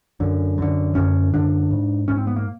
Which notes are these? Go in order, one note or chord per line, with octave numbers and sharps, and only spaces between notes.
F#2 D3
F#2 D3
F#2 D3 C#4
F#2 D3 D4
G#2
G#2 C#4
C4
B3
A#3